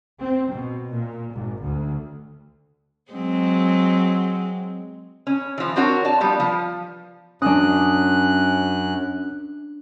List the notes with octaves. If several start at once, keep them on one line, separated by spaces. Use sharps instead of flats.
C4
B2
A#2
G#1
D2
F#3 G#3 C4
C#4
E3 F3
C4 D4 F#4 A#4 C#5
D5 A5
F3 G3 B3
F3
F#2 C#4 D4 D#6 F#6